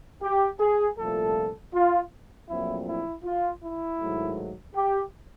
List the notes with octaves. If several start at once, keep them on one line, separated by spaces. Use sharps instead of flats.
G4
G#4
C2 A#2 F3 A3 A4
F4
A#1 A#2 F#3 A3 C4 E4
E4
F4
E4
G#2 D#3 F#3 A3
G4